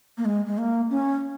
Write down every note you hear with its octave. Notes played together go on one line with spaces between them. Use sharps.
A#3
G#3
G#3
A#3
C#4